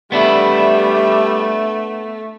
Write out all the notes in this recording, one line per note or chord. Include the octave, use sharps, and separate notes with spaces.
G3 A3 B3 D4 E4